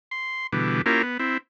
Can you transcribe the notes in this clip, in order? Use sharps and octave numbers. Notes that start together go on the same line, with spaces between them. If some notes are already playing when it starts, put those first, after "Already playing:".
C6
B2 D3 E3 G3
A#3 C#4 E4 F4 G4 A#4
B3
C4 E4